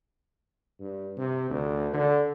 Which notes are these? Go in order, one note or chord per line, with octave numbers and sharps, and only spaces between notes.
G2
C3
D2
D3